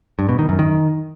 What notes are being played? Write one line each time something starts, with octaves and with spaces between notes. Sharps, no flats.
G2
B2
D#3
F#2
D#3